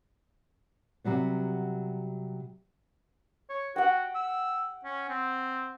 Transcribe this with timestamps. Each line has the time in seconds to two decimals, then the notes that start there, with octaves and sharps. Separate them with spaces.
1.04 C3 F#3 G3 B3
3.49 C#5
3.76 F#4 F#5 G5
4.15 E6
4.85 C#4
5.10 C4